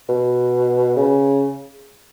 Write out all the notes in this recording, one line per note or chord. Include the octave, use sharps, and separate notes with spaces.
B2
C#3